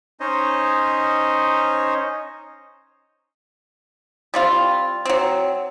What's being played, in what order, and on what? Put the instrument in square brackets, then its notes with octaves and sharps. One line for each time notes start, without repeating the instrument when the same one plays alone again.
[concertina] C#4 D#4 C5 C#5 D#5
[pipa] G3 C4 F4
F#3 C4